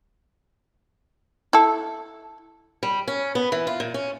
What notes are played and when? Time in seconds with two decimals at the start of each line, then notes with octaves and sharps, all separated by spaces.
1.53 E4 A4
2.83 G3
3.08 C#4
3.35 B3
3.52 E3
3.67 F4
3.80 A#2
3.94 C#4